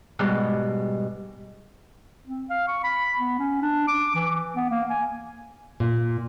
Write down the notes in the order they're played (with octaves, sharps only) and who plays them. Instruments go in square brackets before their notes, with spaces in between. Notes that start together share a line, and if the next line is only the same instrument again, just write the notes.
[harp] G#2 B2 G3 B3
[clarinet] C4
F5
C#6
B5
B3
C#4
D4
D6
E3
B3
A#3
G#5
[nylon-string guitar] A#2